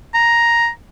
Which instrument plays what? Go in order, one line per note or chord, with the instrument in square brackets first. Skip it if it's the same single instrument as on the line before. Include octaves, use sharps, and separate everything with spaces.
[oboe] A#5